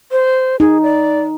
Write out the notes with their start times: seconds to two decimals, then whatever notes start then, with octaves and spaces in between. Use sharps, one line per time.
0.11 C5
0.60 D#4 G#4
0.82 D5